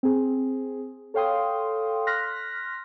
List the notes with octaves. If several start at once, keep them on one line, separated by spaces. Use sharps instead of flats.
C4 G#4
A4 C#5 F5 G5 C6 D#6
C6 F6 F#6 A#6 B6